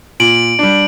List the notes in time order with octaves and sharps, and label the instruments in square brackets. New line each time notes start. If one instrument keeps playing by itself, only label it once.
[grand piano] A#2 [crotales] D7 F#7
[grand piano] G3 D4